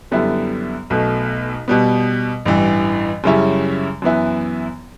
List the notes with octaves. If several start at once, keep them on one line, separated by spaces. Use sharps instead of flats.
F#2 D3 G3 B3 E4
B1 B2 A3
B2 G3 B3
A1 G2 E3
F#2 C#3 G3 C#4 E4
F#2 E3 B3 E4